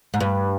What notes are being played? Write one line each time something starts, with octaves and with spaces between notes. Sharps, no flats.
G#2
G2